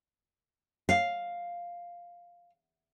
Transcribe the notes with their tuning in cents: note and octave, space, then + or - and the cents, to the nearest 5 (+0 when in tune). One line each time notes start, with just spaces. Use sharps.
F5 +0